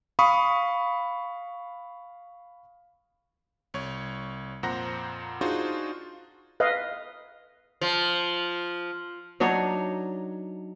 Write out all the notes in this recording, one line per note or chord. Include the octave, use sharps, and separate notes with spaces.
F5 B5 C#6 D#6
C2 C#5
F2 A#2 C5 F#5 A#5 A#6
D4 D#4 F4 F#4 G#4 C5
B4 D#5 F5
F3
F#3 D4 D#4 C#5